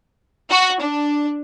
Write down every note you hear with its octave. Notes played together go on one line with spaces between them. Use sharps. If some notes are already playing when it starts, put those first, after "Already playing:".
F#4
D4